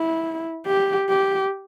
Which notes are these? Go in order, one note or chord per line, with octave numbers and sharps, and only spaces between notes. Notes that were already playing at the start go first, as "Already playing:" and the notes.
Already playing: E4
G4
G4